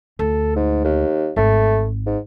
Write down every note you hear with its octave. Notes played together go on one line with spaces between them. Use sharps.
D2 A4
G#2
D#2
G#1 A3
G#2